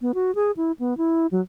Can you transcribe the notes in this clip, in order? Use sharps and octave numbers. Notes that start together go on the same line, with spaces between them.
B3
F#4
G#4
E4
B3
E4
F#3